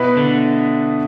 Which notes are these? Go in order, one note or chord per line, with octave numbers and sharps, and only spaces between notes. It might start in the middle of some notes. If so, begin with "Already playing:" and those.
Already playing: B2 B3 E4 B4 E5
D3